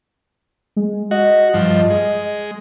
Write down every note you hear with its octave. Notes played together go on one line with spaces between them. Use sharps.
G#3
F#4 D#5
G2 F3
G#3